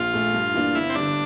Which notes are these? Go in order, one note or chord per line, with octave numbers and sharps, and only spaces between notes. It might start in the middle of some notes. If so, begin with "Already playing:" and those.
Already playing: A#1 F4
A#2 A3
G2
E3 A#3 D4
G1 E4
C4
G2 D3 D4